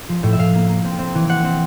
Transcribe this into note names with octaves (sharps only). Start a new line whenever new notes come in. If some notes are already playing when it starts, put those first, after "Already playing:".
F3
A2
E5
A2 F5
A#3
A#3
C4
C4
E3
C4 F#5
C4